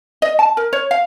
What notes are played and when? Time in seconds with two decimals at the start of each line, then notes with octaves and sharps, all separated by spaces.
0.22 D#5
0.39 A5
0.57 A#4
0.73 C#5
0.91 F5